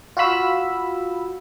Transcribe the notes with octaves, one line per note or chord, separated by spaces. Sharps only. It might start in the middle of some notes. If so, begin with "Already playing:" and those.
F4 F#4 F5 B5 E6